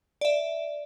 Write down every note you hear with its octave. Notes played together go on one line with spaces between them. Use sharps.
D5 E5